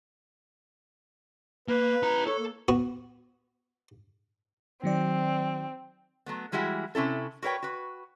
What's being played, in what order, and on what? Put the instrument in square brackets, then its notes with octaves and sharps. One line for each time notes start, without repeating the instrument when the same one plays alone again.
[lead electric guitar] A#3 [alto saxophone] B4
[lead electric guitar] E4 A#5
[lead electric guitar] A4 [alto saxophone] C#5
[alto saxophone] A#3
[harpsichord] B3 F#4
[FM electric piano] D#3 F#3 D5 [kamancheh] C4
[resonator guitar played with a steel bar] F#3 A3 B3
E3 G3 G#3 E4 F#4
C3 C#4 E4 A4
F#4 A#4 B4 C#5 G5
F#4 B4